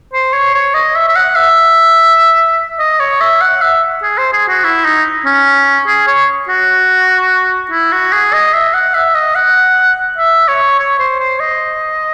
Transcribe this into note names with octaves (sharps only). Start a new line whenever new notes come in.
C5
C#5
C#5
D#5
E5
E5
F#5
E5
D#5
C#5
E5
F#5
E5
G#4
C5
G#4
F#4
E4
D#4
C#4
G#4
C#5
F#4
E4
F#4
G#4
D#5
E5
F#5
E5
D#5
F#5
E5
C#5
C#5
C5
C5
D#5